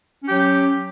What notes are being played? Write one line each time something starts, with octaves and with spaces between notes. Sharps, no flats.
F#3 C#4 G4